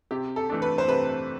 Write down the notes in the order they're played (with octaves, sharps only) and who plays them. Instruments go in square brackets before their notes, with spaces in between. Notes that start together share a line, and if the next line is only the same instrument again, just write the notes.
[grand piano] C3 [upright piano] G4
[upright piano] A4
[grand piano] E3 A3 D4
[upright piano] B4
C5
[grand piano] C3 [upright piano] B4